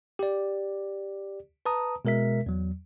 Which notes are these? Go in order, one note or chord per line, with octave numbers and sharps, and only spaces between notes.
G4 D5
B4 A5 A#5 D#6
B2 G#3 A#4 E5 B6
E2 F#3